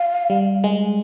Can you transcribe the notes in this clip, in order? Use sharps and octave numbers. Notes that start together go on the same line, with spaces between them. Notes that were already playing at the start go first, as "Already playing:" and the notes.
Already playing: F5
G3
G#3